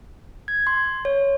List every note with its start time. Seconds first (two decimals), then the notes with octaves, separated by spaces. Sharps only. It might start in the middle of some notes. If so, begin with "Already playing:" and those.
0.48 G#6
0.67 C6
1.05 C#5